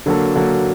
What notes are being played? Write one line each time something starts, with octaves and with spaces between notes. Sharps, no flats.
D3 F#3 A#3 F#4 A4
D3 F#3 A#3 F#4 A4